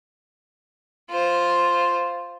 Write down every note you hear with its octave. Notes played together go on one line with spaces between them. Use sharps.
F4 C5